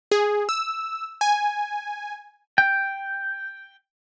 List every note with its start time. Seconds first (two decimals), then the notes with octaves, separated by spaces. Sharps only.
0.11 G#4
0.49 E6
1.21 G#5
2.58 G5